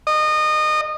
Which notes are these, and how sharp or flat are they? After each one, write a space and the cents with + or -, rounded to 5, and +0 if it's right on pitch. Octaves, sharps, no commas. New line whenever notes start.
D#5 -25